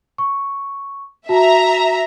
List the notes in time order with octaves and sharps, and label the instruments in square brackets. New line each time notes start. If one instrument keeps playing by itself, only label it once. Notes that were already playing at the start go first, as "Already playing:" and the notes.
[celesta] C#6
[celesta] F#4 A5 [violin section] E5 A#5